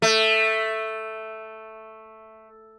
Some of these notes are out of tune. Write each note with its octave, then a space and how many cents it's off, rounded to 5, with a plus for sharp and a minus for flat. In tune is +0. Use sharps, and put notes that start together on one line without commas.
A3 +0